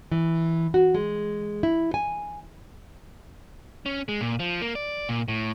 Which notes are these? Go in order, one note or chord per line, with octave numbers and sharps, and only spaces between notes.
E3
F#4
G#3
E4
G#5
C#4
G#3
A#2
F3
A#3
D5
A#2
A2